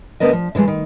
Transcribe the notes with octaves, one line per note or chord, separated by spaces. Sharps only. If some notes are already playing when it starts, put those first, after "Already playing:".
D2 B3 D4 A#4 D#5
F3
D3 E3 F3 G#3 A3
D#3